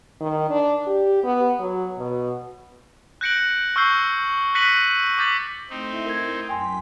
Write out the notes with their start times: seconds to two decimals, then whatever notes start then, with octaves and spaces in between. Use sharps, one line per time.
0.20 D#3
0.50 D4
0.87 G4
1.24 B3
1.59 F#3
1.98 B2
3.21 F#6 G6 A#6 C#7 D7 F#7
3.76 C#6 E6 F6 G6 C7
4.55 F#6 A#6 B6 C#7 D#7 F#7
5.18 D6 G6 A6 B6 F#7
5.70 A3 C4 D#4 E4
6.06 A#4 G#6
6.49 F#2 G5 G#5 C6 B6